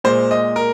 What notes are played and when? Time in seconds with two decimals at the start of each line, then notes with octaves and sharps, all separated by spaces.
0.04 A#2 G#3 C5
0.31 D#5
0.56 A#4